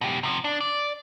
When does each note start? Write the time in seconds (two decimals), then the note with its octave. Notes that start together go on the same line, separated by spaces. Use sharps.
0.01 B2 G4
0.23 C3 F3
0.44 D4
0.60 D5